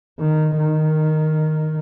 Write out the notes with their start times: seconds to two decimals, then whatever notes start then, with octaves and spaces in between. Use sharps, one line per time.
0.19 D#3
0.57 D#3